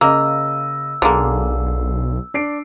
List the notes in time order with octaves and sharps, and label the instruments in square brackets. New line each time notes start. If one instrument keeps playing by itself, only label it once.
[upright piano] C#3 D#5 [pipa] A#3 [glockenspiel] E6
[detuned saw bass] B1 [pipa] D3 A#3 [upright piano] G#4
[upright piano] D4 C7 D7